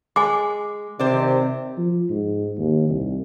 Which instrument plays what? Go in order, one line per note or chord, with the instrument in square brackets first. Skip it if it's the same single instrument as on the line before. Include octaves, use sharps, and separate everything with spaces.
[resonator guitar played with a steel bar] G#3 [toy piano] G#5 D6
[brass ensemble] C3 D#3 [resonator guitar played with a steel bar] C5 D5
[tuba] F3
G#2
D#2
C2